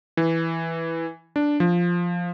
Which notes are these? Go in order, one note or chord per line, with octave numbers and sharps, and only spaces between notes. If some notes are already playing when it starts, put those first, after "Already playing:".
E3
D4
F3